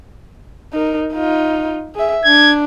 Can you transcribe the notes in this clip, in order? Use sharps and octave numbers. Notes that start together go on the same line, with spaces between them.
D#4 A#4
D#4 F4
G#4 E5
D4 G#6